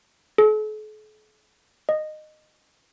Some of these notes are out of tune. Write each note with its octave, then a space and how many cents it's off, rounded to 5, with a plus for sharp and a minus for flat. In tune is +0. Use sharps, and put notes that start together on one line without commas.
A4 -45
D#5 -15